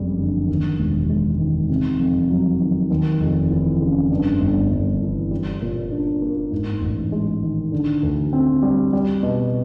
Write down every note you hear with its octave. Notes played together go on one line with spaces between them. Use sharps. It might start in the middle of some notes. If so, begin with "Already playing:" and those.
Already playing: F#1 F2 G3
D3
D#2
E1
G#3
D#3
C3
F2
F#3
D#3
D#2
F1
E3
C#3
G2
G1
G1
E3
G3
A#2
D4
A#3
G#2
A1
G#3
D#3
D3
D2
C4
G3
G3
B2